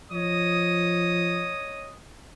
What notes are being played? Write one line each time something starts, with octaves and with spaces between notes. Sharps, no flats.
F3 C#5 D#5 D#6